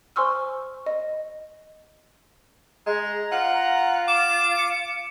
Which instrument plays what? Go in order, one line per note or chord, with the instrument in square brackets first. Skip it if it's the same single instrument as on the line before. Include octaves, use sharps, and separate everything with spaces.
[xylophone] C5 G#5 C6 C#6 E6 F6
D#5
[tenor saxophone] G#3 [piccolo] A#5
[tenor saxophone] F4 [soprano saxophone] F#5
[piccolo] A#5
[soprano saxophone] D6 [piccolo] E7
[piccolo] C#7